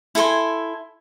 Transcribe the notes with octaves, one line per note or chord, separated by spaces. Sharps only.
E4 A4 G#5 C6